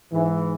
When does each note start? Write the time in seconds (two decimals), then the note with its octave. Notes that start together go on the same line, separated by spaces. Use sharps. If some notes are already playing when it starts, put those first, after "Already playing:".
0.12 G#2 E3